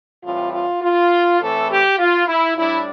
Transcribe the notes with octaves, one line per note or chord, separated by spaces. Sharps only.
A2 E3 G3 C4 F4
F4
F4
A2 E3 A3 C4 A4
G4
F4
E4
A2 G3 D4 E4